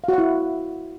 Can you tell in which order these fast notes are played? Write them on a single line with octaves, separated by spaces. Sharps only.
F5 F#4 F#5 E4